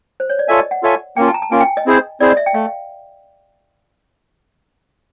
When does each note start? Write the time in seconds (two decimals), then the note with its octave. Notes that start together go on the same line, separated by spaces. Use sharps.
0.20 C5
0.29 C#5
0.39 D5
0.48 F4 A4 C#5 D#5 E5 G#5
0.59 D#5
0.71 F#5
0.83 F4 A4 C#5 E5 G#5
1.16 A#3 C#4 F4 G5
1.28 A5
1.34 A#5
1.42 A5
1.51 A#3 C#4 F4 G#5
1.60 G5
1.77 D#5
1.86 C4 E4 G#4 C5
2.20 C4 E4 G#4 C5 D5
2.29 D#5
2.37 E5
2.46 G5
2.54 A3 F5